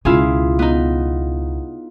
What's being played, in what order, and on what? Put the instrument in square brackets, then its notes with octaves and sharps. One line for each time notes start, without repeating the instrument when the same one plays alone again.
[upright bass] C#2 B2 [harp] E4 F4 G#4
[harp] B3 D#4